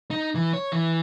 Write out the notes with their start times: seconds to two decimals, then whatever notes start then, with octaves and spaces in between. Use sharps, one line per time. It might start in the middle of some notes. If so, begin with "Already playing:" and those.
0.11 D#4
0.35 E3
0.53 C#5
0.72 E3